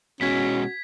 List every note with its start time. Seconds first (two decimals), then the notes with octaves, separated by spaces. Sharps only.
0.21 B2 G#3 C#4 F#4 G#6 B6